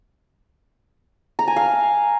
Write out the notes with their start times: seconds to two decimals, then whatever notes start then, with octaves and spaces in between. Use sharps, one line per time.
1.39 A#5
1.48 G#5
1.56 F5